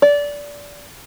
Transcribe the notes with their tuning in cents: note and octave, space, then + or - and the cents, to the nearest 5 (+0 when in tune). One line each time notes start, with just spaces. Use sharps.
D5 -20